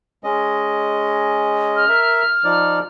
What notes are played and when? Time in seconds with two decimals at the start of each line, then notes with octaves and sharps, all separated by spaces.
0.24 G#3 C#4 D#5
1.76 F6
1.89 A#4 E5
2.44 F3 D#4 D5